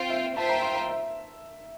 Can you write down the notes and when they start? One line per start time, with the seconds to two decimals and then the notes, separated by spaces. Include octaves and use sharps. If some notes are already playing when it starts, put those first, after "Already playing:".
Already playing: C4 F4 C5 G5
0.10 E5
0.36 F4 C5 E5 G5 A5
0.49 A#5
0.62 C6
0.75 A#5
0.88 E5